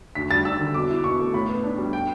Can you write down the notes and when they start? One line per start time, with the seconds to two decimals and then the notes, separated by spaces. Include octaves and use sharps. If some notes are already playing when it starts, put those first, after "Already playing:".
0.15 D2 B6
0.30 G3 A6
0.45 D4 E6
0.60 D3
0.74 B2 D6
0.89 E4
1.04 B2 C#6
1.20 A3
1.34 A2 B5
1.48 B3
1.64 D4
1.78 G3
1.93 G5